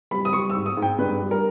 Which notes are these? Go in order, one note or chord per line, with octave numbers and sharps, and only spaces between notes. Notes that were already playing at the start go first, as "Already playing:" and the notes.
G3 B5
D#6
G3 C#6
E6
G#2
D#6
G#2
G5
G2 B4
G3
A#4